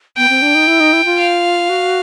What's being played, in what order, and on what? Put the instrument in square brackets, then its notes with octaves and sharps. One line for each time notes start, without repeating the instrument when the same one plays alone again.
[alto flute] B3 [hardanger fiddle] G5
[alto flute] C4
D4
D#4
E4
D#4
E4
F4
[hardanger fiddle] F5
[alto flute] F#4